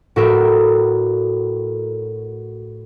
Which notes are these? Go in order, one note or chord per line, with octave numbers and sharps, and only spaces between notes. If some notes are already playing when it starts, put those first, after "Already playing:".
A2 F#4 A#4 E5 D7